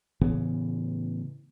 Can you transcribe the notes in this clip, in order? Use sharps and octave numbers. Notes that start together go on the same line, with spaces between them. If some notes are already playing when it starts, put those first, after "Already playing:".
A2 C#3 E3 B3